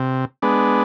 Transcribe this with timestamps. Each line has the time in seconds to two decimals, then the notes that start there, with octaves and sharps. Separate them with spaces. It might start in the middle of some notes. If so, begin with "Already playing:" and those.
Already playing: C3
0.42 G#3 B3 D4